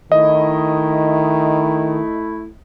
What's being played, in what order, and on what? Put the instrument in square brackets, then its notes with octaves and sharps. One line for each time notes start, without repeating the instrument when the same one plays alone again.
[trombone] D#3 [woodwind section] A3 E4 [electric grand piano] D#5